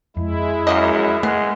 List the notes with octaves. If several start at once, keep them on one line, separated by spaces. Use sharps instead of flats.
F2 G#3 E4
F#2 A#3 F#4 D#5
G#3 A3 B3